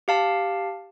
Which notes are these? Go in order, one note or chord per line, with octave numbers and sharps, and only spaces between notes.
G4 F5 A5